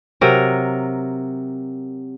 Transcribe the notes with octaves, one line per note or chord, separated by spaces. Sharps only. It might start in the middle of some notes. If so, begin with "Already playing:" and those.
C3 F#3 A#4